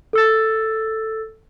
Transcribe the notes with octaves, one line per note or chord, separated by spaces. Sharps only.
A4 E6 A6